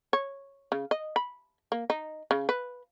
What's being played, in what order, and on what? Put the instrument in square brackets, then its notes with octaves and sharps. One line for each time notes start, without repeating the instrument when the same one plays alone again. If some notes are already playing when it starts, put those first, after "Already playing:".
[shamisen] C#5
C#3
D#5
B5
A#3
D#4
C#3
B4